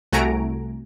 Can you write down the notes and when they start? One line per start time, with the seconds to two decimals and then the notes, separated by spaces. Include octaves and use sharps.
0.12 C2 A3 F#4 G#5 A#5 D7